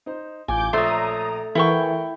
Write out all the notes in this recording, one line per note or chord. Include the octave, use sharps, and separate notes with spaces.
D#4 C5
A1 F4 G#5 D6 G6
A#1 A3 C5 C#5 A#5 D#6
E3 E4 A4 A#4 F#5 G5 C#6